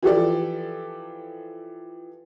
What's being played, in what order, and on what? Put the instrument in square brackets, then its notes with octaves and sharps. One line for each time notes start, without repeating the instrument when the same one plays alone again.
[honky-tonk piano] E3 F3 G4 A4 D5